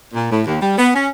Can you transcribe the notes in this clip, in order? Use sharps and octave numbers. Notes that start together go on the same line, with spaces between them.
A#2
A2
D#2
G3
B3
C#4